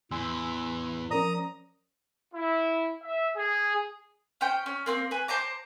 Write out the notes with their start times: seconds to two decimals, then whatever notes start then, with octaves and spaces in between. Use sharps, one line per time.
0.11 E2 A2 G#5 C6 E6
1.11 F3 C#4 A#4 D5 A#5 D#6
2.34 E4
3.02 E5
3.36 G#4
4.41 C#4 C5 G5
4.66 C#4
4.86 A#3 C4 C6
5.11 B4 G#5
5.28 C5 A5 A#5 D6